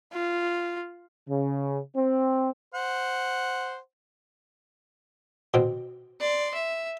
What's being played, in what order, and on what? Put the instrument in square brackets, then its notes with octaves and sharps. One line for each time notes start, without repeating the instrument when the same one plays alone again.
[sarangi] F4
[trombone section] C#3
C4
[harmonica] C5 F#5
[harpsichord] B2 C4
[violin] D5 C6
E5